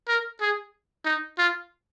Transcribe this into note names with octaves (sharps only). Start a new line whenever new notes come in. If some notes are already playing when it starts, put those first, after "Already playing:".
A#4
G#4
D#4
F4